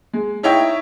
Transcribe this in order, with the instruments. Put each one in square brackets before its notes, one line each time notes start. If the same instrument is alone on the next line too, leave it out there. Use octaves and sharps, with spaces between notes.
[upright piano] G#3
D#4 E4 C#5 E5 G5